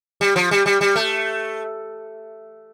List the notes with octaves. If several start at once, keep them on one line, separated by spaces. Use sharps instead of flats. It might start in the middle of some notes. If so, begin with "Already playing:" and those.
G3
F3
G3
G3
G3
A3